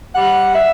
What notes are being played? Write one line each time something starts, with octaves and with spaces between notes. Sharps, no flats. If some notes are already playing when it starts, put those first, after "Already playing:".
G3 F#5
E5